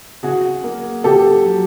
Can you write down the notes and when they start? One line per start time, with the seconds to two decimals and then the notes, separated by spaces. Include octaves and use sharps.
0.23 C#3 F#4 G#4
0.64 A#3
1.04 C#3 G4 A4
1.45 F#3